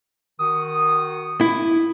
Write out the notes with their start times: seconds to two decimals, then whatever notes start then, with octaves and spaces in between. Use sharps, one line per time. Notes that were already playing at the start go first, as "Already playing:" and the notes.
0.40 D#3 F#4 D#6
1.41 E4